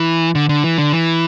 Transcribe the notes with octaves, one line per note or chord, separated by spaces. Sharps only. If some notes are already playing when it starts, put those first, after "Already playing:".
Already playing: E3
D3
D3
E3
D3
E3